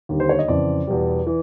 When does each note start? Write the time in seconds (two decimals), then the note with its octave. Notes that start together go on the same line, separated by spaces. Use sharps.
0.09 D#2 D3 G3
0.20 C5
0.29 C#5
0.39 D#5
0.48 F2 C#3 E3 D5
0.87 E2 B2 G3
1.27 E3